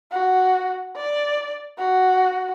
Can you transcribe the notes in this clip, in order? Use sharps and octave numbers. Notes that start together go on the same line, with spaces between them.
F#4
D5
F#4